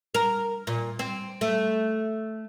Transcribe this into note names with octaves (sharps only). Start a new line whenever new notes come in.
A#4
A#2
C4
A3